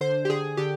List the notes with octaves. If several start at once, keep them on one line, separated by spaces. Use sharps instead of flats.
D3 C5
G4
D3 G#4
D3 G4